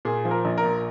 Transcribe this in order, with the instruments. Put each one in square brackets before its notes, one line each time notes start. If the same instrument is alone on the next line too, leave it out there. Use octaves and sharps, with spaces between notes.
[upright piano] A#2 G#4
F3
A#4
A#1
A#4
A#2